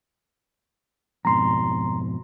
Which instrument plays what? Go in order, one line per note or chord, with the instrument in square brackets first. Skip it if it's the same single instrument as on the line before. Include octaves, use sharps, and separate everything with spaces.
[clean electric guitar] F2 G#2 B2 [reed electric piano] A#5 C6